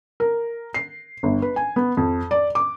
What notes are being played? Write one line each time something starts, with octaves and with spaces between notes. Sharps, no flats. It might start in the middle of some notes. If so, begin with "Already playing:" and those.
A#4
C7
G1
B4
G#5
B3
F2
D5
D6